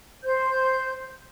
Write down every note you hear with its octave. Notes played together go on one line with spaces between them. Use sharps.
C5 G6